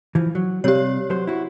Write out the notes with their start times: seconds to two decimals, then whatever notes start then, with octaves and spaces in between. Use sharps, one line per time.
0.15 E3 F3
0.35 F#3
0.64 C3 G3 C4 G4 C#5
1.10 F#3 C5
1.27 E4 F#4